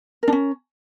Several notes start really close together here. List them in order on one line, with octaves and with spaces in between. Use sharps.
A#4 D4 C#4